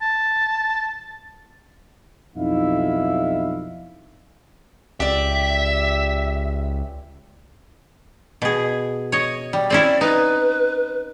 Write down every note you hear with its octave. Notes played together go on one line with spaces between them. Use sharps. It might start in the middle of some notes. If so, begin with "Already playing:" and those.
A5
B1 F2 D#4 E4 E5 F5
C#2 G4 D5 E5
B2 G#4
C#5 D#5
G3
C4 C#4 E4 D5
D#4 B4